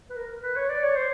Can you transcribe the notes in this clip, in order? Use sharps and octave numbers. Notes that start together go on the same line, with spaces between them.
B4
A#4
B4
C#5
D5
C#5
C5